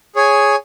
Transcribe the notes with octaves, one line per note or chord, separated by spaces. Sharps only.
G#4 C#5 G#5